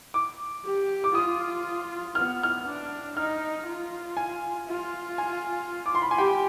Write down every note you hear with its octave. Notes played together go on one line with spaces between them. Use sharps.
D6
G4
D6
F4 D#6
B3 F6
F6
D4
D#4 F6
F4
G#5
F4
G#5
D6
C6
B5
G#5
G4 G5